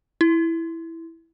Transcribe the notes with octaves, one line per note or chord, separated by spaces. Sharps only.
E4